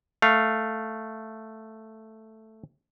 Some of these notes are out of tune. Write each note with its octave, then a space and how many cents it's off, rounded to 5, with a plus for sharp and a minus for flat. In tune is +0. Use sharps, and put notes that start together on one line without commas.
A3 +0 F5 +0